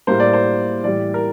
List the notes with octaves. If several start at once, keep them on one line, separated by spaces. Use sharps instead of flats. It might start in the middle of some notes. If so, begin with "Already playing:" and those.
A2 G3 A#3 C5
D5
C5
A2 E3 G3 D5
A#4